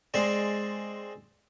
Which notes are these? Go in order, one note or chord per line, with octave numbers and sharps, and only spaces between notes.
G#3 C4 D5